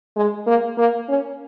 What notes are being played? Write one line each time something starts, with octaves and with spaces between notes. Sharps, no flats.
G#3
A#3
A#3
C#4